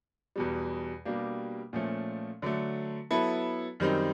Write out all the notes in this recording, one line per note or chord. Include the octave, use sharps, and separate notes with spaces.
E2 B2 G3
B2 G3 A#3 D4 G4
A#2 F3 A3 C#4
D3 F#3 A3
F#3 B3 E4 A4
F#2 D#3 G3 C4 D#4